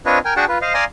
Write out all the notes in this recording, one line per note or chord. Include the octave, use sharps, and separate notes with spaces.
C4 D4 F4 B4 C#5 D#5
A#4 G5 G#5
D4 F#4 G#4 F#5 G5 A5
F4 B4
C5 D#5 F5
D5 F5 G#5 A#5 C6 D#6